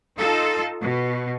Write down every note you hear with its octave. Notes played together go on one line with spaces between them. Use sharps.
D#4 F4 A4
B2